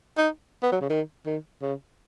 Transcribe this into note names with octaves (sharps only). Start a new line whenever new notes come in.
D#4
B3
F#3
C#3
D#3
D#3
C#3